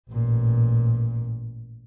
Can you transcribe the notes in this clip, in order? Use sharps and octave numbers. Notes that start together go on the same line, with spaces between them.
A1 A#2